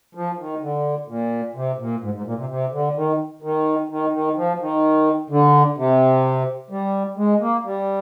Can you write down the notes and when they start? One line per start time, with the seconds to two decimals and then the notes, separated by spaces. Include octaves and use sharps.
0.15 F3
0.38 D#3
0.62 D3
1.08 A#2
1.55 C3
1.79 A#2
2.02 G#2
2.14 G#2
2.25 A#2
2.37 C3
2.49 C3
2.72 D3
2.96 D#3
3.42 D#3
3.89 D#3
4.13 D#3
4.36 F3
4.60 D#3
5.30 D3
5.77 C3
6.70 G3
7.18 G#3
7.41 A#3
7.65 G3